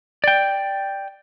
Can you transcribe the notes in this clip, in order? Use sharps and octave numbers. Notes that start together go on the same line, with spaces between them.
D5 G5